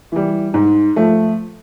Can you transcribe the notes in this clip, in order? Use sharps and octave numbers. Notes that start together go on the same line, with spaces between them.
E3 G3
G#2
F3 A3